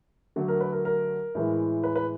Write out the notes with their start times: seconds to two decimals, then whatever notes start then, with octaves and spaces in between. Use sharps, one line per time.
0.36 D3 F#3 A3
0.48 A#4
0.61 B4
0.72 A#4
0.85 A#4
1.35 A2 E3 G#3
1.84 B4
1.96 B4